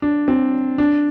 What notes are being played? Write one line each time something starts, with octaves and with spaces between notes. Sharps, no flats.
D4
C4
D4